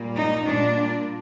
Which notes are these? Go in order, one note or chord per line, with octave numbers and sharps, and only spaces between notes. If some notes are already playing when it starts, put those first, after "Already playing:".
Already playing: A#2 G3 A#3
D#4
A#2 G3 A#3 D4